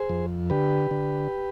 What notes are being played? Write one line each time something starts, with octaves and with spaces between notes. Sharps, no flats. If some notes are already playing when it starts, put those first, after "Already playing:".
Already playing: G#4 C5
F2
D3 G4 B4
D3